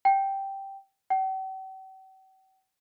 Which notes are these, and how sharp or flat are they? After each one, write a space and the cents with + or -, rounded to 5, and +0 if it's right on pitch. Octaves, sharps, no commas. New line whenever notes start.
G5 -5
G5 -45